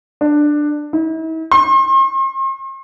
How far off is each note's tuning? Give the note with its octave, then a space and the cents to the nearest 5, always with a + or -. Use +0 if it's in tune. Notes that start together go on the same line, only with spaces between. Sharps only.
D4 +10
E4 -45
C6 +40